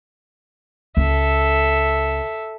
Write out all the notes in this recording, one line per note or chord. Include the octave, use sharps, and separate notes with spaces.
C#2 A4 E5